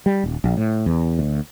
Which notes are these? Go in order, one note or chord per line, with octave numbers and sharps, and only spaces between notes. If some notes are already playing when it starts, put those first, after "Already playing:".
G3
D#1
A#1
A2
E2
D2